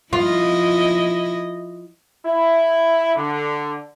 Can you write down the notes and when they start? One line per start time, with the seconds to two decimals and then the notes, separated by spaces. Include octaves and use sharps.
0.13 F3 E4 F4 D#5
2.25 E4
3.16 D3